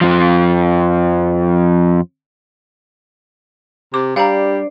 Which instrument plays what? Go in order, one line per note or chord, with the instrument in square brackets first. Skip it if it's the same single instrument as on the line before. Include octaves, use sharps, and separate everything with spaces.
[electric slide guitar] F2 F3
[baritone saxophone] C3 [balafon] D6
[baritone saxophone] G3 [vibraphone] D4 C5 D5 [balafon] F5 A#5